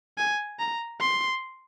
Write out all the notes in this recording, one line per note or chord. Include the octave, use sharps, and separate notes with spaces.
G#5
A#5
C6